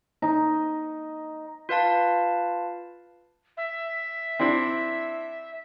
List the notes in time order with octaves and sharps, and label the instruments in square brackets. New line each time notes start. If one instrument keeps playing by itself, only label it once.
[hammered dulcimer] D#4
[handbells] F4 B4 F5 A5
[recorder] E5
[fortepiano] C4 D4 E4